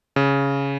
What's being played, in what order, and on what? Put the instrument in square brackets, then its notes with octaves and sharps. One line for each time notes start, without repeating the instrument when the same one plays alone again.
[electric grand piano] C#3